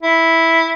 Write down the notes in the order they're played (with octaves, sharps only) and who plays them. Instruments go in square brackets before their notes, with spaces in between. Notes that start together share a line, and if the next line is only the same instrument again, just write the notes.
[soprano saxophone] E4